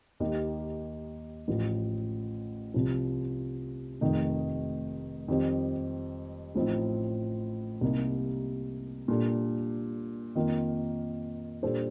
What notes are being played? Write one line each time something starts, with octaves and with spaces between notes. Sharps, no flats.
D#2 D#3 A#3 D#4 G4
A1 A2 F3
C2 C3 F3
F1 F2 D#3 A3 D#4
F2 D#3 G3 C4 G4
A1 A2 F3 C4 D#4
C2 C3 G3 A#3 D#4
A#2 G3 D4 A4
F2 D#3 A#3 F4
A#2 G3 D4 A4 C5